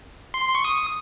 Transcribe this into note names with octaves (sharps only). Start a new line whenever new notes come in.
C6
C#6
D#6